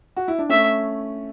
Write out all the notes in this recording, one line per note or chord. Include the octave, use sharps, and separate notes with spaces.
F#4
E4
D4
A3 C#4 E5